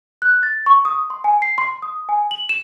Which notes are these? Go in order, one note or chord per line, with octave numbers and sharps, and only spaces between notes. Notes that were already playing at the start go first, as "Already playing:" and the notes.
F#6
A6
C#6
D#6
C6
G#5
C7
C6
D#6
G#5
F#7
E7